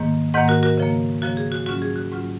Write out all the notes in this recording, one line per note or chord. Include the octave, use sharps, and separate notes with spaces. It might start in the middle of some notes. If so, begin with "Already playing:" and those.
Already playing: G#2 D#3 A#3
G#2 D#3 A#3 D#5 F#5
F#4 A#4
F#4 A#4
C#3 F3 A#3
C#3 F3 A#3 F#4
G#4
F#4
G#2 F#3 C#4 F4 F#4
G#4
F#4
G#2 F#3 C#4 F4